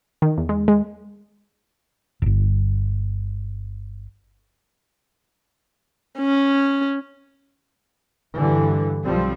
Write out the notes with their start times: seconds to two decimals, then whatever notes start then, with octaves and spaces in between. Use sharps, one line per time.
0.22 D#3
0.38 E2
0.49 G#3
0.68 G#3
2.22 D1 G1
6.19 C#4
8.34 G2 D3 E3
9.03 B1 F3 G3 C4